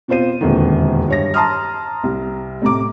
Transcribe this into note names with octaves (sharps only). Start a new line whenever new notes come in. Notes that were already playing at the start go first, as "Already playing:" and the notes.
B2 C4 F4 C5 D#7
E1 A#1 F2 D3 D#3
G2 C#5 A#6
A5 A#5 C6 D#6 F6
C2
A2 C3 A#5 D6